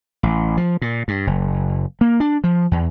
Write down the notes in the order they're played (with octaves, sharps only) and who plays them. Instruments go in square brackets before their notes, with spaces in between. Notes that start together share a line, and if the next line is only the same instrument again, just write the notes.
[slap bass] A1
F3
A#2
G2
F#1
A#3
D4
F3
E2